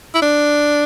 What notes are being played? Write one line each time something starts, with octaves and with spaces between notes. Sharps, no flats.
E4
D4